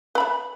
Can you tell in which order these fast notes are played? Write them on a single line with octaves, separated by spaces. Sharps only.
B4 B5 E5